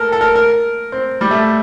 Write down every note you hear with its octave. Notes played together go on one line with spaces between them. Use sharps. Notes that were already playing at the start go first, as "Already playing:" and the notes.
Already playing: A4 A#4
A4
A#4
A#4
C4
G3
A3